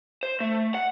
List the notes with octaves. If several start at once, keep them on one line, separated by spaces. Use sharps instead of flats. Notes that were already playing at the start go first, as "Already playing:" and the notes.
C5
A3
F#5